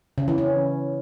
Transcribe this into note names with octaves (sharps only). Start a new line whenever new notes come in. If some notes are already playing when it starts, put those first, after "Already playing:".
C#3
E3
C#4